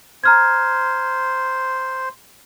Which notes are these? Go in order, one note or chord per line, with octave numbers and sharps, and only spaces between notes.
C5 A#5 F6 G#6